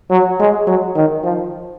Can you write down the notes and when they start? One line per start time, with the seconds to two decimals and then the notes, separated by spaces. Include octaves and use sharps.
0.10 F#3
0.39 G#3
0.67 F#3
0.96 D#3
1.23 F3